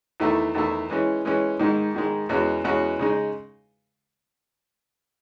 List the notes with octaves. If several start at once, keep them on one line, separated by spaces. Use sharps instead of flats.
E2 D#3 A3 E4
E2 D#3 A3 E4
E3 G#3 C#4
E3 G#3 C#4
G#2 D#3 G#3
G#2 D#3 G#3
E2 B2 G#3 C#4 F#4
E2 B2 G#3 C#4 F#4
C#3 G#3 D#4